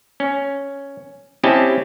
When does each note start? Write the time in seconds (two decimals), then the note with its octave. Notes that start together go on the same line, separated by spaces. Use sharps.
0.20 C#4
1.43 C4 C#4 E4 G4 D#5 A5